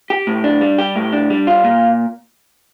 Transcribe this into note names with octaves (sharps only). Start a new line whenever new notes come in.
G4
A2
D4
G3
G4
A2
D4
G3
F4
A#2